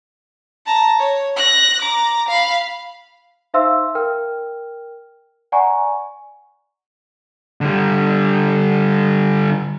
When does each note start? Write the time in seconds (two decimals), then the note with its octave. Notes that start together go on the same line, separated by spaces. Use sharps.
0.66 A5 A#5
0.99 C#5
1.36 F#6 A#6
1.81 A#5 D6
2.28 F5 B5
3.54 D#4 C5 E5 F5 C6 E6
3.95 A#4 G5 F6
5.52 D5 F#5 G#5 A#5 C#6
7.61 D3 G3